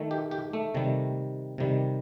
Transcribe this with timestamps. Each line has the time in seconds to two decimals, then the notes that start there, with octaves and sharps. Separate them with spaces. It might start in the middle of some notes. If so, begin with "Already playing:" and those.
Already playing: D#3 A3
0.11 G4
0.31 G4
0.53 A3
0.74 C3 D#3 G3
1.58 C3 D#3 G3